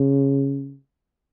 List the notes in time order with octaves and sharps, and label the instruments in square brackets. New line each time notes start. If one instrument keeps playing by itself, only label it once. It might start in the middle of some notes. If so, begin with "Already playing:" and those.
Already playing: [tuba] C#3